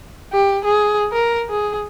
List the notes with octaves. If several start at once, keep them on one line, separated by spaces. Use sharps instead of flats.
G4
G#4
A#4
G#4